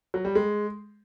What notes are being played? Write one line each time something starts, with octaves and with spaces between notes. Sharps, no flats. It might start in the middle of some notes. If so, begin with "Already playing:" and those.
F#3
G3
G#3